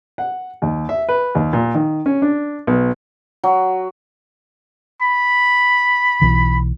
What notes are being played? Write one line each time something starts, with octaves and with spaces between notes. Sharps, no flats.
F#5
D#2
E5
B4
D#2
A#2
D#3
C#4
D4
B1
F#3
B5
B1 E3